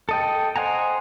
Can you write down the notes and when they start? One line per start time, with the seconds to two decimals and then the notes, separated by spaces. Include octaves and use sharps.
0.09 A4 D#5 G5
0.56 C5 D#5 F#5 G#5 A#5